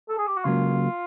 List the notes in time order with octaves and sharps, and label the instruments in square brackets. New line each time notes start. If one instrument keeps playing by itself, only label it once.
[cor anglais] A4
G#4
G4
F#4
[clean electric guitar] C#2 C#3 F#3 A#3 [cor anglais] F4